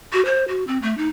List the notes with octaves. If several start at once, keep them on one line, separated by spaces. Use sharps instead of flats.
F#4
C5
F#4
C4
A3
D#4